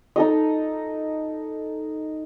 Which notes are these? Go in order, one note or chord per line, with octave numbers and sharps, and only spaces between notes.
D#4 A4 D#5